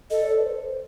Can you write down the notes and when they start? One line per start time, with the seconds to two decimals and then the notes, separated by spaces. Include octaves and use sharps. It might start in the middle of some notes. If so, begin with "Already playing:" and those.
0.10 A4 D#5
0.23 D5
0.28 C#5
0.38 B4
0.45 C5